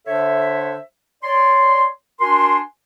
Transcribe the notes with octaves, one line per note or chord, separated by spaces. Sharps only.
D3 D4 A4 C5 C#5 E5
C#5 D5 C6
D4 F#4 A#4 G#5 C6